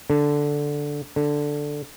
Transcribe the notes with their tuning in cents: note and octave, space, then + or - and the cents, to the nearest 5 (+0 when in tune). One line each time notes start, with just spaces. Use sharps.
D3 -5
D3 +0